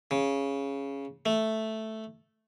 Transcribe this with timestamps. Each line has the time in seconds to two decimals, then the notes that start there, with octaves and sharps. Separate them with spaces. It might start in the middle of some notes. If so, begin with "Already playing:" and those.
0.11 C#3
1.26 A3